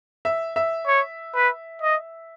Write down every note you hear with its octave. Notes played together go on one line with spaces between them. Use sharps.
E5
E5
C#5
B4
D#5